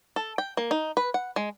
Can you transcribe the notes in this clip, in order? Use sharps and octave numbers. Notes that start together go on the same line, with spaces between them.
A4
G5
A#3
D#4
B4
F#5
G#3